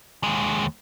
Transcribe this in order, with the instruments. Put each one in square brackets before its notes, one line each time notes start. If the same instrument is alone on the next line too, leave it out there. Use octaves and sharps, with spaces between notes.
[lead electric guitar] D#2 G#3